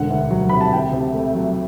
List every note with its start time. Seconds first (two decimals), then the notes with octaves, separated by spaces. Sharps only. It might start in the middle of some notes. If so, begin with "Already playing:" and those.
Already playing: E1 D3 F#5
0.10 D2
0.30 F#3
0.49 C3 B5
0.61 A5
0.72 D2 G5
0.93 C3
1.14 A3
1.35 F#3